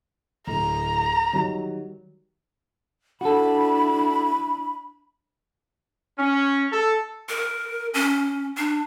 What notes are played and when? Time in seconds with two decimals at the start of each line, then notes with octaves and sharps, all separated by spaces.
0.47 D1 A#5
1.33 D#3 F#3 G3
3.21 D4 E4 F#4 A4 B5
6.18 C#4
6.73 A4
7.29 A#4
7.94 C#4
8.57 D4